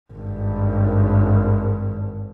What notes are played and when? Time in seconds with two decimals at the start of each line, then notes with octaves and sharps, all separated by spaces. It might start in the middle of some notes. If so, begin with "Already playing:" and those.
0.12 G#1 G2